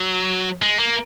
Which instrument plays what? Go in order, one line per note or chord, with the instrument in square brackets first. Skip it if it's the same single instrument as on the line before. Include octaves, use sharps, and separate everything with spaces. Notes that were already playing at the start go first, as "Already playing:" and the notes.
Already playing: [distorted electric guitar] F#3
G#3
A#3